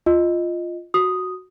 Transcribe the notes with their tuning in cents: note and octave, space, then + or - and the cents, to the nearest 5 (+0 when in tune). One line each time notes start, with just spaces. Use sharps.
F4 +0 D#5 +0
F#4 +0 D#6 +0